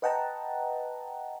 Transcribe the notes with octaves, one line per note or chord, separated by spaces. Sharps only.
B4 D#5 F#5 G5 A5 A#5